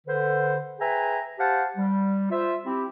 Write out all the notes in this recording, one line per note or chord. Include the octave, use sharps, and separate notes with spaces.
D3 B4 C5
G#4 B4 E5 G5 G#5 A#5
G4 C5 F5 F#5 A5
G3
F4 C5 E5
C4 E4 G4